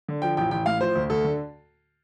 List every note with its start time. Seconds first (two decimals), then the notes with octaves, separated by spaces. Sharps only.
0.08 D3
0.22 F3 G5
0.37 A1 G5
0.51 A1 G5
0.66 A2 F5
0.81 F3 C5
0.95 D2
1.10 D2 A4
1.24 D3